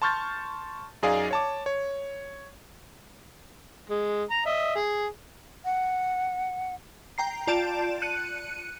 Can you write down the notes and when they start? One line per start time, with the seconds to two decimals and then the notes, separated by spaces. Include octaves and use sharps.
0.02 A5 C6 C#6 F6 G6 A6
1.03 F#2 D#4 G#4 D5 D#5 F5
1.31 C#5 A5 D6
1.66 C#5
3.89 G#3
4.30 A#5
4.46 D#5 E5
4.76 G#4
5.65 F#5
7.18 G5 A#5 C7
7.47 F4 D5 A5 G6 D7 E7
8.02 F#6 C#7 D#7